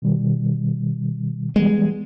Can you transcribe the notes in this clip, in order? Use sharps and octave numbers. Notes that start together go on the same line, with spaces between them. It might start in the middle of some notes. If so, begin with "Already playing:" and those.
B2 D#3 G3
E3 G3 G#3 B3